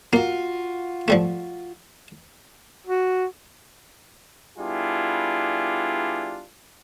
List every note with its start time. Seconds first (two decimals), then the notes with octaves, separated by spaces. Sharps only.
0.13 A#3 F4 F#4
1.08 F3 G3 A3
2.87 F#4
4.59 G3 B3 D4 E4 F4 G#4